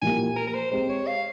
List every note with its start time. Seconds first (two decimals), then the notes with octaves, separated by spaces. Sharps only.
0.02 A#2 F3 A#3 E4 G4 G#5
0.36 A#4
0.47 A#4
0.54 C5
0.72 G#3 C4 G4 C5
0.89 C#5
1.07 F5